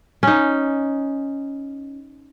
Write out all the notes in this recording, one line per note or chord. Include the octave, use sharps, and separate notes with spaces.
C#4 D#4